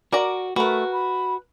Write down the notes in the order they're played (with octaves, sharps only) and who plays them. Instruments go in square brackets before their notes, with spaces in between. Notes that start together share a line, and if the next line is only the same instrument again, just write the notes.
[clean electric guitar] F#4 [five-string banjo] A#4 D5 A#5
[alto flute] A3 [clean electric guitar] F#4 [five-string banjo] A#4 B4
[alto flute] B5